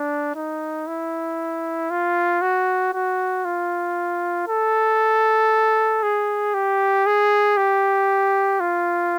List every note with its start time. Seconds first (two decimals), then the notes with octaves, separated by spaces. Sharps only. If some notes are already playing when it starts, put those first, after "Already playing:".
Already playing: D4
0.35 D#4
0.87 E4
1.90 F4
2.41 F#4
2.93 F#4
3.45 F4
4.48 A4
6.02 G#4
6.54 G4
7.06 G#4
7.57 G4
8.60 F4